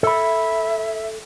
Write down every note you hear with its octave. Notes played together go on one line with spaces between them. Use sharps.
A4 E5 B5